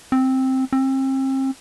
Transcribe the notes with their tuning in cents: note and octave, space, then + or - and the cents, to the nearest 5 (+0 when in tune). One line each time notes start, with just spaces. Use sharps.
C4 +5
C4 +35